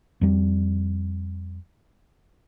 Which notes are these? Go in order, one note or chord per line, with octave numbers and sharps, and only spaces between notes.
F2 G3